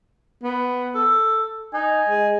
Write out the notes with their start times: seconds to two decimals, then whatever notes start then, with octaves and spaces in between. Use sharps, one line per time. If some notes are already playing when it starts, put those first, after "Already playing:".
0.43 B3
0.95 A4
1.74 D#4 G#5
2.09 G#3